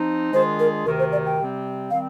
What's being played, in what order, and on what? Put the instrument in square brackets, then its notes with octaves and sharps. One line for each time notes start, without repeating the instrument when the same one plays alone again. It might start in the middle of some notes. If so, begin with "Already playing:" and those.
Already playing: [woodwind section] F3 C4 D#4
[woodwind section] D#3 G#3 D4 F4 G#4 [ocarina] C5
[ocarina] A#4
[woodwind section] D2 C3 D#3 [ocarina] A#4
[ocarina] C5
D5
G5
[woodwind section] C3 G3 C4
[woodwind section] D#3 G3 C4 [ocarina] F5